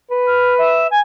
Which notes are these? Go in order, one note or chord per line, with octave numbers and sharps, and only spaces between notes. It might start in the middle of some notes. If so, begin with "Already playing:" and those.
B4
F6
E5
G#5